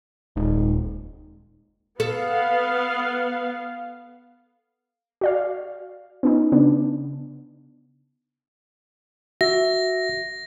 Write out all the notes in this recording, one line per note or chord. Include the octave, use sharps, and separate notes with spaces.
D#1 G#2
B3 A4 F5
F#4 D5 F5
B3 C#4 D#4
C#3 B3 D4
F#4 E5 A#6